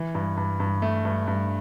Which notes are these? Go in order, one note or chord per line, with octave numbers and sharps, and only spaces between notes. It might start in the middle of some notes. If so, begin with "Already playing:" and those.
Already playing: E3
G2
G2
G2
A3
G2
G2